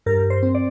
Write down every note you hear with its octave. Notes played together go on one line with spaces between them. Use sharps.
G2 A#4
C5
C4
D5